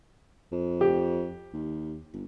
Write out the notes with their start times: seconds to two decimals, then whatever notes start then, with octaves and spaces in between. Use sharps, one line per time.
0.52 F2
0.81 G4
1.53 D#2
2.13 G1